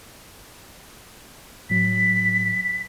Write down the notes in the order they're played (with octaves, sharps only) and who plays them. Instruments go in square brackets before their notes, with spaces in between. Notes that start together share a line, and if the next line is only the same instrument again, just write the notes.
[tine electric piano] A2 F#3 [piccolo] B6